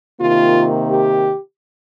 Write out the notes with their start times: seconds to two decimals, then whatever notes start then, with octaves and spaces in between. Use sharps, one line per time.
0.20 C3 D#3 A#3 F4
0.89 G4